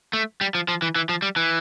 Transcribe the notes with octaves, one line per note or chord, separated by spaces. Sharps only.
A3
G3
F3
F3
E3
E3
F3
G3
E3